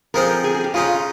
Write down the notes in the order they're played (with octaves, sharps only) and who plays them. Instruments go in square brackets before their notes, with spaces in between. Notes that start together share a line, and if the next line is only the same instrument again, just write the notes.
[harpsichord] F3 G#3 C4 D#4 [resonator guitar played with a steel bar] A#4
[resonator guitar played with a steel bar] G#4
G#4
G4
[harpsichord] C#3 G#3 D#4 [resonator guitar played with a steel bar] F4